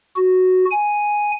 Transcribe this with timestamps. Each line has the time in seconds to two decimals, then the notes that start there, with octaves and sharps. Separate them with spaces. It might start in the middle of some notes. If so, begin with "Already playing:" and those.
0.16 F#4
0.71 G#5